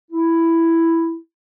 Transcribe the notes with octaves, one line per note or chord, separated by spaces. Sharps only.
E4